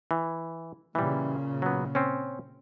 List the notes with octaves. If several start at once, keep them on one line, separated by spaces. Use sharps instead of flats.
E3
A#2 C#3 E3 G3
F#3 B3
C4 C#4